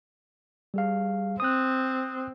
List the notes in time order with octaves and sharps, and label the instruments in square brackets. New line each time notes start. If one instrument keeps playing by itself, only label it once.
[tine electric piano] G3 G#4 F5
[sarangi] C4 [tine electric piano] D#6 F#6